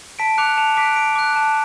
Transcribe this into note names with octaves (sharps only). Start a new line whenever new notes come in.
A5 B6 D7
D6 F#6 C#7 F7
A5 C#7 F7
D6 F#6 B6 D7
A5 B6 D7
D6 F#6
A5